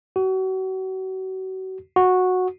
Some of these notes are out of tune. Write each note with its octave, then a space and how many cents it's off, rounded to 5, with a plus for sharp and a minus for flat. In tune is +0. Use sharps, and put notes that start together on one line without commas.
F#4 +35
F#4 -10